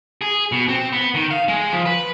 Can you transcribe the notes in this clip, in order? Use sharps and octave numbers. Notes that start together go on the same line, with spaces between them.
G#4
B2
C4
B3
D#3
F5
G#3
F3
B4